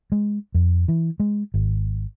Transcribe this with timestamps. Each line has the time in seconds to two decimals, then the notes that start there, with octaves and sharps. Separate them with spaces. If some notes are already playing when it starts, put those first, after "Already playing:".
0.12 G#3
0.54 F2
0.88 E3
1.20 G#3
1.54 G#1